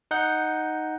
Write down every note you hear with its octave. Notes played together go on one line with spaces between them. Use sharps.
D#4 F#5 G6